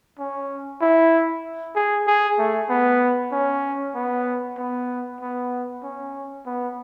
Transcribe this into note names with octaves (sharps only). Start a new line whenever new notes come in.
C#4
E4
G#4
G#4
A3
B3
C#4
B3
B3
B3
C#4
B3